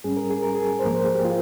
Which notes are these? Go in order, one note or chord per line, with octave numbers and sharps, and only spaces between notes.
G#2 G3 C#4 G#4
A#4
G#4
A#4
G#4
C5
G#2 F3 A#3 A#4
C5
G#4
G4
F4